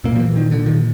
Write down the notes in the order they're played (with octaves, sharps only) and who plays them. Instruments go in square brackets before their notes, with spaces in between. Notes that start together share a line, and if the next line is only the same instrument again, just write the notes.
[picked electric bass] A#2 A#3
F3
E3
D#3
D3
A#2 D#3